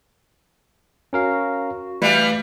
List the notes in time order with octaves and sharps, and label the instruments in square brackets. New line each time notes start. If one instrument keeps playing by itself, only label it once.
[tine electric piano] C#4 A#4 F5 [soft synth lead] F#4
[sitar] E3 G3 [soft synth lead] A3 [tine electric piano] B4 F5